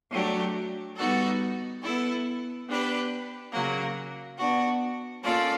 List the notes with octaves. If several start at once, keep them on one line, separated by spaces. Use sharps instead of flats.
F#3 A3 D4 G4
G3 B3 D#4 F#4 A4
B3 E4 A4
B3 D4 G4 B4
C#3 F#3 A#3
B3 D4 F#4
A#3 C#4 F4 A4 D5